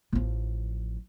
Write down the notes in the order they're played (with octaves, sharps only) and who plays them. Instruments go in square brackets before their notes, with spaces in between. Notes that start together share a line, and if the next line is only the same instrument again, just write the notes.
[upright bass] A1 F3